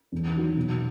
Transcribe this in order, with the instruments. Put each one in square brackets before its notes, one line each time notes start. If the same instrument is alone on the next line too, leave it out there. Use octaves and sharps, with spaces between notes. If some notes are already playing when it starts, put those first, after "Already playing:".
[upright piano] E2
D#3 F#3
B2